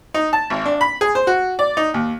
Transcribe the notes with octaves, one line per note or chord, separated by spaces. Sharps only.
D#4
A5
G#1
D4
B5
G#4
C5
F#4
D5
D#4
D#2